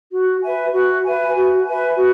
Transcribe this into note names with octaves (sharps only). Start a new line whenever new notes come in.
F#4
B4 E5 G#5
F#4
B4 E5 G#5
F#4
B4 E5 G#5
F#4